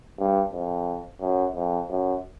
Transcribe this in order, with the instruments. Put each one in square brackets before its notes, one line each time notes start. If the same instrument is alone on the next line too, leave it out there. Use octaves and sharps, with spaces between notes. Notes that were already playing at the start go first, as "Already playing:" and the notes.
[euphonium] G2
F2
F#2
F2
F#2